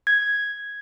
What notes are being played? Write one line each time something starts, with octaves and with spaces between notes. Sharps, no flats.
G#6